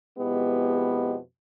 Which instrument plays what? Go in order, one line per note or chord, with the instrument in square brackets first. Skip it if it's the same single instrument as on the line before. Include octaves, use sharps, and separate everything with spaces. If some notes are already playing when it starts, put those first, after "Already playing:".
[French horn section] F2 B2 G#3 B3 E4 G4